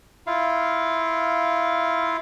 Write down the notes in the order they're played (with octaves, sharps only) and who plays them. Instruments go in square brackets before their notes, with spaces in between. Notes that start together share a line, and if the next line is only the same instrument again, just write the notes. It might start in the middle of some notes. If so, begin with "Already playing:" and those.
[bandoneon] E4 F4 F5